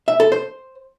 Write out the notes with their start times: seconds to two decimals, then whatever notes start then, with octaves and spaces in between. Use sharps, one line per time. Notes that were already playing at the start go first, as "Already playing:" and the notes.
0.08 E5
0.20 A4
0.32 C5